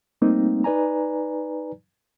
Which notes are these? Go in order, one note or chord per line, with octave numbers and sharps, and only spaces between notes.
G3 A3 A#3 C4 D#4
D#4 B4 D5 G#5 A#5